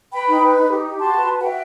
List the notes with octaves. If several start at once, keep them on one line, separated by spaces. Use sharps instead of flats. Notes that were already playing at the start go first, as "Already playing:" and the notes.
B4 G5 B5
D#4
B4
D#4
G4
G4
F#4 A5 C6
B4
F#4
F#5
F#4 E5 G5